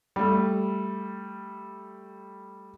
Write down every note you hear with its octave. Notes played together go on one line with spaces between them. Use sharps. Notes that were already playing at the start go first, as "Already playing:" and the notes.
G3 A3